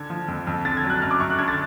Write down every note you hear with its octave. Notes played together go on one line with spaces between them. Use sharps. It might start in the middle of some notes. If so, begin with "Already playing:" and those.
Already playing: D3 G#6
F3
F2
F2
D3 A6
G#6
F#3
F#6
F#2 F6
D6
F#2 C#6
F#6
D3 G#6
A6